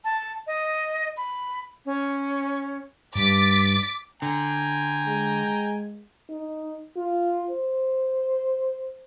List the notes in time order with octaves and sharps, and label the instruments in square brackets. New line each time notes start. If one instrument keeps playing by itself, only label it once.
[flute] A5
D#5
B5
C#4
[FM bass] G2 [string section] D6 A6 B6
[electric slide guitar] D3 [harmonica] G5 G#5 A#5
[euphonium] G#3
[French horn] D#4
F4
C5